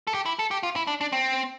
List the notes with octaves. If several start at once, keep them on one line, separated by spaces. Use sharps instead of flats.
A4
G4
E4
A4
G4
F4
E4
D4
D4
C4